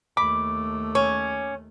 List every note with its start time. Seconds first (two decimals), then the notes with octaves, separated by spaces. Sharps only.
0.17 D#2 A3 B5 D6
0.95 C#4 C#5